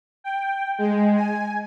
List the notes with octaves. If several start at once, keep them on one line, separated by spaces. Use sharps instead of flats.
G5
G#3
G#5